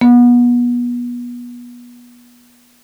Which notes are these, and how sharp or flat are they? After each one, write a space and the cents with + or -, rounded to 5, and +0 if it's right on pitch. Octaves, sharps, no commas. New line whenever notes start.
B3 -30